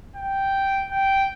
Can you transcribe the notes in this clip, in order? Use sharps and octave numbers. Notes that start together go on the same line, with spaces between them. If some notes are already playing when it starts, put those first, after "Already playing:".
G5
G5